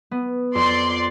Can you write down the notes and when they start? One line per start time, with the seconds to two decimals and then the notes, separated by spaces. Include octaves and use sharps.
0.11 B3
0.55 F2 D5 C6